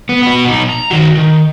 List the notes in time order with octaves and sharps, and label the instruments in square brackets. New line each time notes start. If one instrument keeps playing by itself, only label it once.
[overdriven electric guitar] B3
B3 F#4
B2 D#4
A#5
D#3 F#4
D#3